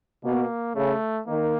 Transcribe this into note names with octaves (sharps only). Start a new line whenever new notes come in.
B2 A#3
C#3 A3
D#3 A#3